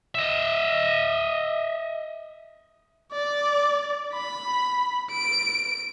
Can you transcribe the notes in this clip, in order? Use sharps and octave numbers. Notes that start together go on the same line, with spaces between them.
D#5 E5
D5
B5
D7